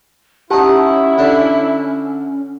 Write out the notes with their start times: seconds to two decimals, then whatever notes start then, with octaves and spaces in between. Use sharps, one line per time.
0.51 C#4 D#4 E4 G4 F#5 A5
1.18 D3 D4